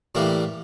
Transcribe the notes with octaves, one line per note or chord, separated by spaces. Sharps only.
A2 E3 G3 A#3